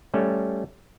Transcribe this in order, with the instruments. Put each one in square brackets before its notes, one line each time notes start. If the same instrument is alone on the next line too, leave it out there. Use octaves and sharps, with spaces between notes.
[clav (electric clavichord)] G3 A3 C#4